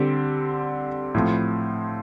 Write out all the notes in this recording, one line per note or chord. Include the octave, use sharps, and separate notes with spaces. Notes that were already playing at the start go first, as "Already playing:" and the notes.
Already playing: D3 G3 C4 G4
A2 F3 C4